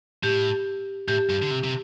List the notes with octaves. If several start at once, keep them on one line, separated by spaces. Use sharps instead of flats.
A2 G4
A2 G4
G2
D3
C3
C3